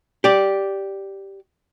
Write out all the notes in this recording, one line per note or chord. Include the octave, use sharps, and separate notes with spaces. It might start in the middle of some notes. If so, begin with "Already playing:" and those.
G4 D5